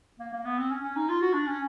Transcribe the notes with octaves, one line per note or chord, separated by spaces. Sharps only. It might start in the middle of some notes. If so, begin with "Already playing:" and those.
A#3
A#3
B3
C4
C#4
C#4
D#4
F4
F#4
D4
C#4